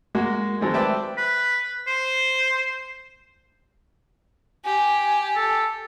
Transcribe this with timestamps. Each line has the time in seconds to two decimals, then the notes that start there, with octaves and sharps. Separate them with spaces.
0.15 G#3 A#3 F#4
0.61 D#3 F#3 G#3 A3 C4
0.74 B4 C5 D5 E5 G5 A5
1.18 B4
1.87 C5
4.65 G4 G#5
5.36 A4